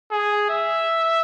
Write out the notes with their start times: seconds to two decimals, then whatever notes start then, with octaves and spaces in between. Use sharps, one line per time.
0.12 G#4
0.50 E5